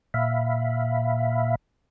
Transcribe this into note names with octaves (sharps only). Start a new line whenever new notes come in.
A#2 E5 F5 B5